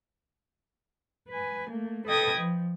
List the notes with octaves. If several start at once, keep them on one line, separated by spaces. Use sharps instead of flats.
B4 G#5
A3 A#3
A4 B4 D#5 G5 D#6 G#6
F3